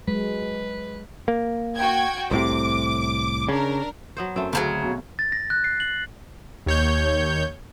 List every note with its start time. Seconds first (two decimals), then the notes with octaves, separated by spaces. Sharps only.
0.08 F#3 G#3 B4
1.28 A#3
1.77 F#4 G5 G#6
2.31 C2 A2 C3 D6
3.49 C#3 D4 A#4
4.17 F#3 B3 C5
4.36 F#2 A3 C4
4.53 D2 C#3 F3 F#3 F#5
4.83 B1
5.19 A6
5.32 A#6
5.50 F#6
5.64 C7
5.80 F#7
6.66 D#2 C#5 G6